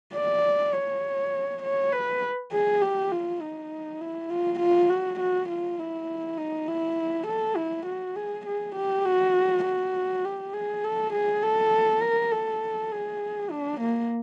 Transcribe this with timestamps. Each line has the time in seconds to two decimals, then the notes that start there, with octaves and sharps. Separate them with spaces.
0.14 D5
0.73 C#5
1.63 C#5
1.92 B4
2.52 G#4
2.82 G4
3.12 F4
3.41 D#4
4.00 E4
4.30 F4
4.60 F4
4.90 F#4
5.20 F#4
5.49 F4
5.78 E4
6.38 D#4
6.68 E4
7.27 A4
7.56 E4
7.86 F#4
8.16 G#4
8.46 G#4
8.76 G4
9.06 F#4
9.64 F#4
10.25 G4
10.53 G#4
10.84 A4
11.13 G#4
11.43 A4
12.02 A#4
12.32 A4
12.92 G#4
13.51 D4
13.80 A#3